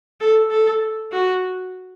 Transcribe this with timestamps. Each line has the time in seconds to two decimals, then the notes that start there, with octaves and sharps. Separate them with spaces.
0.21 A4
0.51 A4
1.11 F#4